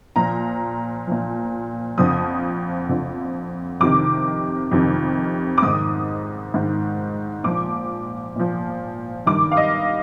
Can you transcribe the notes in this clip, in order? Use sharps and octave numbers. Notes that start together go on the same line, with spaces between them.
A#2 F3 A#5
A#2 F3
F2 D3 F3 D#6
F2 D3 F3
F2 C3 D#3 D6
F2 C3 D#3
D6
G#2 D#3 D#6
G#2 D#3
A#2 F3 D6
A#2 F3
G2 D#3 D6
F5
D#5